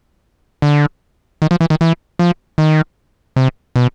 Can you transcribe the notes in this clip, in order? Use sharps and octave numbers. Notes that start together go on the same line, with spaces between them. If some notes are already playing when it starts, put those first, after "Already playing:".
D3
D#3
F3
E3
D#3
E3
F3
D#3
C3
B2